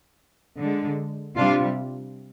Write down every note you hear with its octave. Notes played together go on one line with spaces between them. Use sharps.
D3 G#3
C3 G3 D4 F4